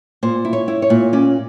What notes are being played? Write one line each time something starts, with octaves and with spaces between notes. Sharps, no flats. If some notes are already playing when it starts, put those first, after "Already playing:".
A#2 C5
E4
C#5
E4
C#5
A#2
C#4 D5